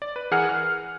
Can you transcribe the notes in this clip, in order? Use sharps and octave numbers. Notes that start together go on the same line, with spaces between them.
D5
B4
E3 G#4 A#4 F#5 F6
F6